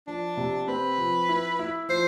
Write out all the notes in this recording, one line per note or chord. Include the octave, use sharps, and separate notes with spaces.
F3 D4
C3
C4 B4
F3
E4
E4
F3 C5